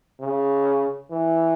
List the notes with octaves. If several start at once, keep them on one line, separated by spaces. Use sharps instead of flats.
C#3
E3